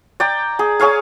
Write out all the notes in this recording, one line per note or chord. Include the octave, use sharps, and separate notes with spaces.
D5 G5 A#5
G#4
G#4 C#5 F5 G#5